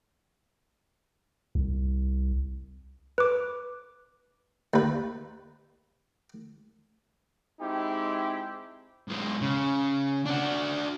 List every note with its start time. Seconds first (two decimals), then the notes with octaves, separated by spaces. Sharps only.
1.55 C2
3.18 B4 D6
4.74 D#2 B4
7.60 G#3 C4 D#4 E4 G4
9.08 B1 G#3
9.42 C#3
10.26 D4 F#4